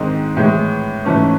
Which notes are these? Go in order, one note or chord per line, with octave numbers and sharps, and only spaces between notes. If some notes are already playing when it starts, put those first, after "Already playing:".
Already playing: G#2 D#3 G#3 C4 D#4
A2 E3 G#3
G#2 E3 A3 C#4